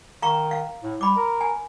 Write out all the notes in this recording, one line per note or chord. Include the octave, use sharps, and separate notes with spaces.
D#3 F5 A#5 C#6
F5
A2
G3 B5 D6
A#4
G#5